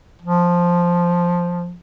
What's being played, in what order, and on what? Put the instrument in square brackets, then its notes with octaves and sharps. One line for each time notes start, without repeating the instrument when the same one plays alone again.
[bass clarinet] F3